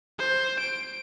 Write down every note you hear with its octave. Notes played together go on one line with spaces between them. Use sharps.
C5
D7